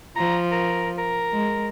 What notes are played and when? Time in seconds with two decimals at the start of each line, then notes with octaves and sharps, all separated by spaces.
0.16 F3 A#5
0.52 A#4
0.98 A#4
1.32 G#3